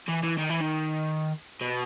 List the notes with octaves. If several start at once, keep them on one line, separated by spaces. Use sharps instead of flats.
E3
E3
D#3
E3
D#3
B2